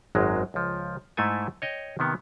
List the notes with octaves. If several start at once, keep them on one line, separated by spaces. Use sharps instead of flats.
G#1 F#2 F#3 G#3
C#2 F3
G#2 A3 E4 A4 G#5
C#5 D#5 G5
C3 D#3 B3